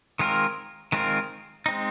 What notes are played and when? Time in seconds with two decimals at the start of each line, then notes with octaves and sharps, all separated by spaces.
0.19 D#3 G#3 C4 F4 A#4
0.92 D#3 G#3 C4 F4 A#4
1.66 G#3 C4 D#4